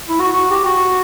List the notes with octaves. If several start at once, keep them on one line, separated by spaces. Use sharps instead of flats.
E4
F#4
F#4
G4
F#4